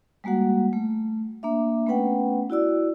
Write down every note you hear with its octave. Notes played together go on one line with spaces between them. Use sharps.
G3 G#3 A#3 F#4 F#5
A3
A#3 D4 E5
A3 B3 C#4 B4 F#5 G5
E4 F#4 D5 E6